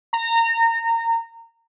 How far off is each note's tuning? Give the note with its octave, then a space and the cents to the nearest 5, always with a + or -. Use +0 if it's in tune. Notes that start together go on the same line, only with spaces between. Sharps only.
A#5 -25